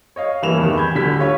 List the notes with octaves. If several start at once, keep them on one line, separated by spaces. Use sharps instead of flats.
C#5 D#5 F5
G2 E3 A#3 E7 F7
E2 G#2 C3 D#3
G#5 B5 G6 G#6
D1 D3 G3 B6
F4 C#5